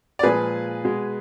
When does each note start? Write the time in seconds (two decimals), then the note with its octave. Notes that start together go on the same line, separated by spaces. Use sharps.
0.19 D5
0.23 A#2 F3 G#3 G#4 B4
0.84 B2 G#3